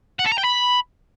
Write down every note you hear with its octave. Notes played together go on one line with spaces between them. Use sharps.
F#5
A4
A#5
G5
B5